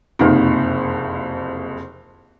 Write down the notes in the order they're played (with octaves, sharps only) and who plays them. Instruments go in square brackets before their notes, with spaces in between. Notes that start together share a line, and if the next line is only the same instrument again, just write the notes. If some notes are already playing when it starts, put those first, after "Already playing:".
[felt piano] F#1 C2 F2 [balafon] A#3 D#4